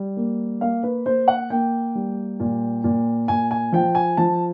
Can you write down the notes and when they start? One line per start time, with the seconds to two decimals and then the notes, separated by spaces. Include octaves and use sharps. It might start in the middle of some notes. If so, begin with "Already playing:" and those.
Already playing: G3
0.17 A#3
0.61 A#3 F5
0.83 B4
1.06 A#3 C5
1.28 F#5
1.50 A#3 G5
1.95 G3
2.40 A#2
2.84 A#2
3.28 A#2 G#5
3.51 G#5
3.72 F3 G5
3.95 G#5
4.17 F3 A5